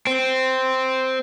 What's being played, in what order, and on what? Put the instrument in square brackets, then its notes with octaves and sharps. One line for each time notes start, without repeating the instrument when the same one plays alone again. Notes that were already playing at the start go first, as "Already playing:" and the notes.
[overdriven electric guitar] C4